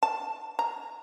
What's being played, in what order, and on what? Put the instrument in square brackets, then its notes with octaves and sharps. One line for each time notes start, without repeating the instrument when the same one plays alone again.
[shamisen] A5
A#5